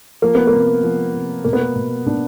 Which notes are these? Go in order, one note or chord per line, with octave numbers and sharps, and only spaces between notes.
F3 A#3
B3
A#3
C3
F3
C3
B2 A#3
B3
A#3
B2
B2 D4